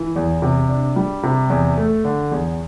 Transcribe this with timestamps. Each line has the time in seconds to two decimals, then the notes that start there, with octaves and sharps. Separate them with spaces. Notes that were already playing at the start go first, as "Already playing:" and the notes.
Already playing: E3
0.16 E2
0.42 C3
0.69 D4
0.96 G3
1.23 C3
1.50 E2
1.77 A3
2.04 D3
2.31 E2